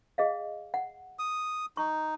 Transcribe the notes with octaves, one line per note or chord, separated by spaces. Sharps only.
G#4 D#5 F5
F#5
D#6
D#4 C#6